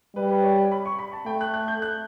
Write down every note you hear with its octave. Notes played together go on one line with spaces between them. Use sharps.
G3 B4
B4
C#5
D5
B5
C#6
B5
A5
A3 G5
F#6
F#6
G6
F#6